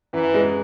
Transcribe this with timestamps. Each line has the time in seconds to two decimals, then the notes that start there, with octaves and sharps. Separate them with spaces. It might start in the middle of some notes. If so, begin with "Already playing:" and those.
0.13 F#2 E3
0.34 G#3